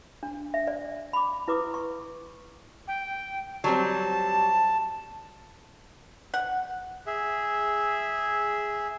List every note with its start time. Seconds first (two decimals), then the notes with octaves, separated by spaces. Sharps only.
0.23 D4
0.54 E5
0.67 D5
1.13 B5 D6
1.48 E4 B4 D6 D#6
1.74 C#6
2.88 G5
3.64 F#3 G3 C4 A5
6.34 F#5
7.07 G#4 E5